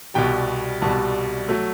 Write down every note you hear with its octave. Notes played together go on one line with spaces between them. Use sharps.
C2 B2 G3 G5
C2 B2 G3 A5
F#3 A3